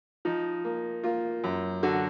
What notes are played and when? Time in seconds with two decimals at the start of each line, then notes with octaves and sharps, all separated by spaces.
0.25 F3 D#4
0.65 A#3
1.04 A#3 F4
1.44 F#2
1.83 D3 F#4